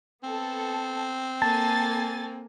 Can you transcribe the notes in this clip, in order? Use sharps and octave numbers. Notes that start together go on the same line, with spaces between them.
B3 C4 A4
A#3 A4 G#5 A5 A6